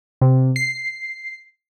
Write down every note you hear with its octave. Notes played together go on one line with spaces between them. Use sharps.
C3
C7